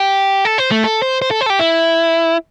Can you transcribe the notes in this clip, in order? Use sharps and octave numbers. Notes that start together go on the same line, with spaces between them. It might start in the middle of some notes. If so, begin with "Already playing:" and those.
Already playing: G4
A4
C5
A3
A4
C5
C5
A4
C5
A4
G4
E4